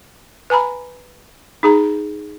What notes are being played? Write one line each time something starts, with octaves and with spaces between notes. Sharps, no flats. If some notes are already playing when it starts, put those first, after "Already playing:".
B4 G#5 A#5 B5
D#4 G#4 A#5